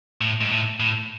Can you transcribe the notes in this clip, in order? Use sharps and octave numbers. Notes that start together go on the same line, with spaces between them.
A2
G#2
A2
A2